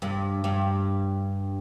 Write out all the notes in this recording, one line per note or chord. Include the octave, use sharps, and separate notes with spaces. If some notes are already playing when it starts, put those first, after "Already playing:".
G2
G2